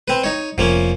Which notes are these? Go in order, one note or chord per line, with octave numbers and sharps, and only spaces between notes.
C4 B4
D#4 C#5
F1 F3 A#3 C#4